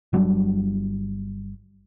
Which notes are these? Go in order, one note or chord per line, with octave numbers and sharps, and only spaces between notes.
G1 F#3 G3 D4